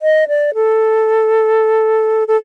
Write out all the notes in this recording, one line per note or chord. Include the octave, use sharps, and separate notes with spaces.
D#5
D5
A4
A4